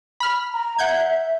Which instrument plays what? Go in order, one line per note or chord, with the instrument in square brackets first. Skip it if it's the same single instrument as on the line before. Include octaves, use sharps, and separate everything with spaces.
[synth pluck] B5 F6
[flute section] A#5
[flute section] E5 [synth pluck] F#5 G6 G#6